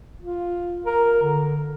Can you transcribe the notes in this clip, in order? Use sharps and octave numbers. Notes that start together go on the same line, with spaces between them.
F4
A#4
D3